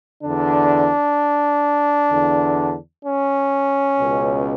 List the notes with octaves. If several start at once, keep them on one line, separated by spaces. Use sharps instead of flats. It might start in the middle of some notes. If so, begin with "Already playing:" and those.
E2 D3 D4
E2 D3
C#4
C#2 B2